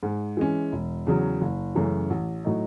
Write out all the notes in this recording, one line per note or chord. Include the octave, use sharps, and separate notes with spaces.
G#2
E3 G#3 C#4
E1
E2 C#3 F#3
F#1
F#2 C#3 E3 A3
A1
A2 F#3 A3 D#4